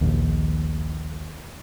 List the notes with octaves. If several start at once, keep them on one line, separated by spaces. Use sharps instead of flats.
A#1 D#2